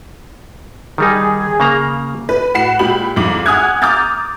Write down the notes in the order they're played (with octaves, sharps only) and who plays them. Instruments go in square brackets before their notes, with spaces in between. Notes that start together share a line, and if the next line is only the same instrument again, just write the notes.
[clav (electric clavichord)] D#3 G3 D#4 [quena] G#4
[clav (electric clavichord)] C#3 A#3 A#5
[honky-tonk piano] B4
A2 F#4 F#5 B5 C7 E7
A#2 G#3 G4 B5 F#7
C2 F2 G#2 A#5 D6 F#7
F#5 G#5 D#6 F6 F#6 G#6
A#5 D6 D#6 F6 G6 A6